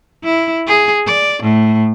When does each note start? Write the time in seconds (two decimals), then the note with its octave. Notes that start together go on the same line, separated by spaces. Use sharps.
0.24 E4
0.67 G#4
1.07 D5
1.43 A2